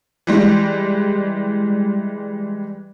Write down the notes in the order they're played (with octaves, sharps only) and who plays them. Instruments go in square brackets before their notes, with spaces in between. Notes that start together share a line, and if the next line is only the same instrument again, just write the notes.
[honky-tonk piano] E3 G3 G#3